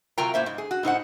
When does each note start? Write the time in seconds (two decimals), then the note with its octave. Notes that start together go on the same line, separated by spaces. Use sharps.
0.18 C3 F#3 F4 A#4 G5 A#5
0.34 A2 A#3 C5 E5
0.46 G#2
0.58 G#4
0.71 F#4
0.83 A2 D#4 C5 F#5